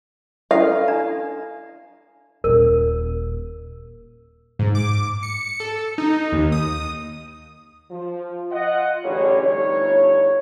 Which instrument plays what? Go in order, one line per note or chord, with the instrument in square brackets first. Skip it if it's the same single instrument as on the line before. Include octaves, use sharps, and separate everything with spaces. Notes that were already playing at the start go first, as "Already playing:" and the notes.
[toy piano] C#4 E4 A4 [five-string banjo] F5
[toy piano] D4 A#5
[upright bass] D#1 [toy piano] A#4
[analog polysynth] G#2
D6
C#7
A4
D#4
D#2
D#6
[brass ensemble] F3
F4 D#5 F#5
A1 D3 G3 C#4 G#4 C#5
G1 A2 C3 D#4 C#5